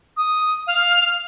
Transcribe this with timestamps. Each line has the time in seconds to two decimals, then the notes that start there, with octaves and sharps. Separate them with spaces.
0.17 D#6
0.67 F5